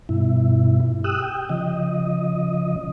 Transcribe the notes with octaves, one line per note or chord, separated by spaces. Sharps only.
G2 B2 E4
G4 D#6 E6 F#6
G5
C#3 F3 D#5